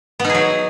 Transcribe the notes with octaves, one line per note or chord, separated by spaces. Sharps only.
B3
D#4
G#4
F#3